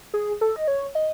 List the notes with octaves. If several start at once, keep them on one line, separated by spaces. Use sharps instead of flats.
G#4
A4
D#5
C#5
D#5